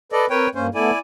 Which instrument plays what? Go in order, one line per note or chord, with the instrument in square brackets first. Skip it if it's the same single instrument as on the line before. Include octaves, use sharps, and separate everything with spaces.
[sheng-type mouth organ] A4 D5 D#5 [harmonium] B4
[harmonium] C4 A#4 [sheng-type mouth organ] B4 C#5 G5
[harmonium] G2 A#3 [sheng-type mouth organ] C#4 C5
[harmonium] A3 B3 A4 [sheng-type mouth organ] E4 D5 G#5